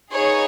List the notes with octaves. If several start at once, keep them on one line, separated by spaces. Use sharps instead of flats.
B3 D#4 G#4 C#5